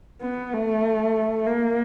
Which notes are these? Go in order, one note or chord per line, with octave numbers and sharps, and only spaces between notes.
B3
A3
A#3